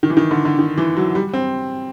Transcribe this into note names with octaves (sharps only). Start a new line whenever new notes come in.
D#3
E3
D#3
D3
D3
D#3
E3
F#3
G3
C4